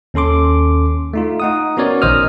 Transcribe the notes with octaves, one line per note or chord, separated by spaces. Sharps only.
D#2 C#4 A4 C6 D6
A3 D#4 F4
D#4 F#5 D#6
B3 C#4 F#4 A#4 C#5 D5
A#1 D#3 C5 D#5 D#6 F6